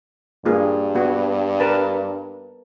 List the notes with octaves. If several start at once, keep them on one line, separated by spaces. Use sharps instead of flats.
G2 A#3 F4 G#4
B3 F#4
A#4 B4 A5